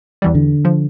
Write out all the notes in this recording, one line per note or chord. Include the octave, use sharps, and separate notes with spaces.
E2 E3 G3
D3
F3